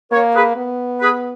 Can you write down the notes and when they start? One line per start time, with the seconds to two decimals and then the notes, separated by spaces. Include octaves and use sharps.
0.12 A#3 A#4 C#5
0.35 G#4 B4
0.56 B3
1.01 G#4 B4